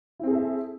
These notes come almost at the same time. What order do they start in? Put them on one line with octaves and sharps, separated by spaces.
E4 C4 G#4 A4 E5